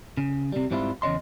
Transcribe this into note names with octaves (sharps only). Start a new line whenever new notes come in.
C#3
C3 G3
G#2 G3 C4 C#4 E4 F4
E2 C#3 C#5 D#5 C6